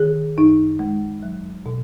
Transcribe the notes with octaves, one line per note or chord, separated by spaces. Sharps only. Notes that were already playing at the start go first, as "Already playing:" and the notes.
Already playing: D#3 G#4
F#2 D#4
G#3
F#3
B2